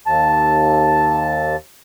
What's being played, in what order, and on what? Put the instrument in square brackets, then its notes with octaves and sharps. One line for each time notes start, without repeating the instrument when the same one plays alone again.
[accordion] D#2 A5